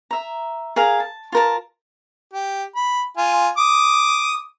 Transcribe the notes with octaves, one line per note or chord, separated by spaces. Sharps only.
E5 A#5
G#4 A#4 F5
A5
F4 A#4 A5
G4
B5
F4 G#5
D6 D#6